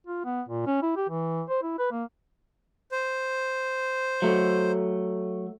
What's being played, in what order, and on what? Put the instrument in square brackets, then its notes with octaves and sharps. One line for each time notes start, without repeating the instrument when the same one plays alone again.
[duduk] F4
B3
A#2
C#4
E4
G4
E3
C5
E4
B4
A#3
[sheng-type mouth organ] C5
[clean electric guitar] F#3 A3